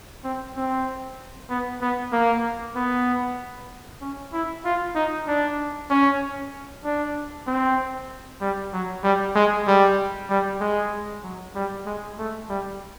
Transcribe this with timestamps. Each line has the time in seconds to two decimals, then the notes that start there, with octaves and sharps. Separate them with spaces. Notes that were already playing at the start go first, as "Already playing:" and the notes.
0.24 C4
0.56 C4
1.50 B3
1.81 B3
2.12 A#3
2.76 B3
4.01 C#4
4.33 E4
4.65 F4
4.95 D#4
5.27 D4
5.90 C#4
6.84 D4
7.47 C4
8.41 G3
8.73 F#3
9.03 G3
9.35 G#3
9.67 G3
10.29 G3
10.61 G#3
11.23 F#3
11.55 G3
11.86 G#3
12.18 A3
12.49 G3